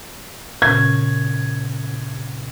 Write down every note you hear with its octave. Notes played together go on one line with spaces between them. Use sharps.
A#2 C#3 C#4 G#6